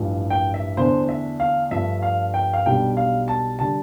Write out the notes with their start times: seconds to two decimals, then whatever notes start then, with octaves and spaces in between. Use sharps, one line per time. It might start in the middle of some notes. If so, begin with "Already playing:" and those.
Already playing: A1 G2 F3
0.30 G5
0.54 E5
0.77 E2 D3 A3 D4 C5
1.09 E5
1.40 F5
1.71 G2 F3 A3 D4 E5
2.02 F5
2.34 G5
2.53 F5
2.65 B1 B2 G3 D4 G5
2.97 F5
3.28 A5
3.59 D3 G3 D4 A5